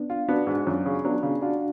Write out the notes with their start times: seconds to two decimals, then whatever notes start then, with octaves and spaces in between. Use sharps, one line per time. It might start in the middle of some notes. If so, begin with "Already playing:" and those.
Already playing: B3 D4
0.10 F4
0.28 B3 D4 F#4
0.47 G#2
0.66 F#2 C#4 F4
0.86 C#3
1.04 F#3 B3 D4
1.23 C#3
1.42 D4 F4 F#4